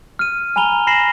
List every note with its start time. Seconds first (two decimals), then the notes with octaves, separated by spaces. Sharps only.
0.19 F6 D#7
0.56 G#5 A#5 B5 F7 G7
0.87 B5 A#6 C7 E7 F#7